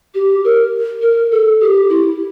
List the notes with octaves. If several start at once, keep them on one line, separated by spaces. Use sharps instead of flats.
G4
A#4
A#4
A4
G4
E4